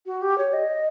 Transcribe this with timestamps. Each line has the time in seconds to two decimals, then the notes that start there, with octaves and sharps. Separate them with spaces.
0.06 F#4
0.21 G4
0.38 C#5
0.53 D#5